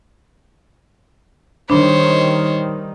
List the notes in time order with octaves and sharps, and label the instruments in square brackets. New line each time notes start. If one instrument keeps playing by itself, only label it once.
[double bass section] D#3 G3 [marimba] D4 B5 [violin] C5 C#5